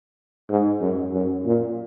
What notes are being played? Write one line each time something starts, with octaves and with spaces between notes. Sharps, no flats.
G#2
F#2
F#2
A#2